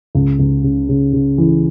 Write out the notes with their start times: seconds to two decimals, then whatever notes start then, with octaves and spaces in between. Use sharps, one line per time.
0.15 C#2
0.39 C#2
0.64 C#3
0.89 C#3
1.13 C#3
1.38 E3